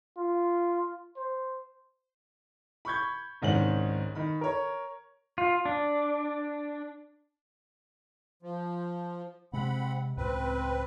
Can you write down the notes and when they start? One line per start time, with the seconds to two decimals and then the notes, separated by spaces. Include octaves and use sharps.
0.17 F4
1.16 C5
2.85 B5 C#6 G6 G#6
3.42 C2 G#2 D#3 C#4 F#7
4.15 D#3 B5
4.41 A#4 C#5
5.38 F4
5.65 D4
8.43 F3
9.53 C3 G#3 C4 F#5 B5
10.17 C#2 A2 C#3 C4 B4